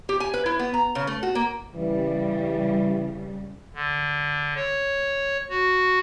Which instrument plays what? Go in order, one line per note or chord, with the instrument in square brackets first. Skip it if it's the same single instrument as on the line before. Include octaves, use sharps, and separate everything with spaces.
[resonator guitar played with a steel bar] G4
G#5
B4
E4
B3
A#5
C#3
A3
F#4
A#3
[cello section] C#3 G3 [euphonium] E3
[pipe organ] D3
C#5
F#4